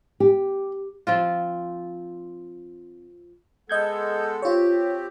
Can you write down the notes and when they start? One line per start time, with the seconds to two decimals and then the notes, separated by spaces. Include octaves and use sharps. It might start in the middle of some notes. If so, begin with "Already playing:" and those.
0.20 G4
1.07 F3 C4 F4
3.69 G#3 B3 A4 D#5 G6 G#6
4.42 C4 F4 G4 C#5